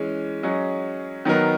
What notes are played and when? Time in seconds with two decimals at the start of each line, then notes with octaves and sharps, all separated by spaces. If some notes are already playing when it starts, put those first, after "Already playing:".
Already playing: E3 G#3 C#4
0.43 F#3 C#4 G#4 D#5
1.25 D#3 F#3 B3 D#4 A#4